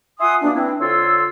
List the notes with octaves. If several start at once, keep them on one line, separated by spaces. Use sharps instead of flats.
F4 E5 F#5 G#5 C6 D#6
B2 A#3 D4
E3 C4 D4 E4
F2 D3 F4 C#5 C6 E6